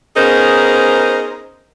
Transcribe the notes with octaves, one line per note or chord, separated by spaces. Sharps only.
B3 C#4 D#4 G#4 A#4 C5